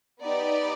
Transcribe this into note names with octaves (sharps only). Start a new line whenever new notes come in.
B3 D#4 G4 D5